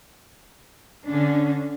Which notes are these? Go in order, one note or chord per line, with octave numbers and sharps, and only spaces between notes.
D3 C#4 D4